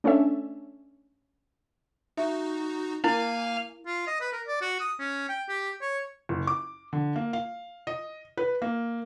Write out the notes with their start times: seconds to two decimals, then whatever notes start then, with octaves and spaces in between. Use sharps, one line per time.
0.04 A3 C#4 D4 A4 E5
2.17 D#4 F#4 E5
3.04 A#3 E4 A#4 F5 G#5
3.86 F4
4.07 D#5
4.21 B4
4.33 A#4
4.47 D5
4.61 F#4
4.80 D#6
4.99 C#4
5.29 G5
5.49 G4
5.81 C#5
6.29 F#1
6.47 D6
6.93 D3
7.16 A#3
7.33 F5
7.87 D#5
8.37 B4
8.62 A#3